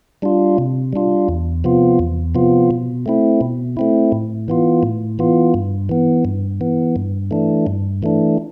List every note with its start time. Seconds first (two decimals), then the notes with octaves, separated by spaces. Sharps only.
0.22 G3 D4 F4
0.58 C3
0.93 G3 D4 F4
1.29 E2
1.64 C3 F3 B3 F4
1.99 E2
2.35 C3 F3 B3 F4
2.71 B2
3.06 A3 C4 E4
3.41 B2
3.77 A3 C4 E4
4.12 A2
4.48 E3 B3 F4
4.83 A2
5.19 E3 B3 F4
5.54 G2
5.89 E3 B3
6.25 G2
6.61 E3 B3
6.96 G2
7.31 E3 A3 D4
7.67 G2
8.03 E3 A3 D4